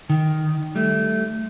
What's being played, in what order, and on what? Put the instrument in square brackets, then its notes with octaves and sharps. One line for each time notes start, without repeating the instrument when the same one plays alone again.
[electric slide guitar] D#3
G3 A3